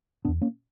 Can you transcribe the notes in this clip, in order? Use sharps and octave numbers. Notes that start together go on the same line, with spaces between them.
B2 B3 D4
E2
A#3 C#4